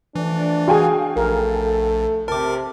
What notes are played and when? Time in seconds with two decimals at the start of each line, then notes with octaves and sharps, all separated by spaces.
0.15 E3 F3 A3 D4
0.68 F#4 G#4 F5 G5 G#5
1.16 A#1 A3 A4 A#4
2.28 C3 A#4 A5 D6